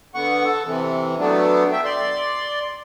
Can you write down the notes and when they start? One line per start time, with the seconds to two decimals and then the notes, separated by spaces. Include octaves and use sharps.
0.15 D3 B3 F#5 C#6
0.44 A4
0.65 C3 E3
1.19 F#3 A3 B3 D4
1.72 E5 G5
1.84 D5 C6